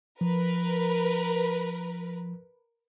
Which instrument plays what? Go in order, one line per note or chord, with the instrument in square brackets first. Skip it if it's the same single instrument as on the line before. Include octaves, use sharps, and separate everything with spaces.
[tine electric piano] F3 [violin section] A#4 B4